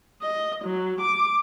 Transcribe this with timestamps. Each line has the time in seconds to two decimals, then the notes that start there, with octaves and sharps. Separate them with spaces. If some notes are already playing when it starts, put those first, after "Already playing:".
0.22 D#5
0.65 F#3
1.01 D6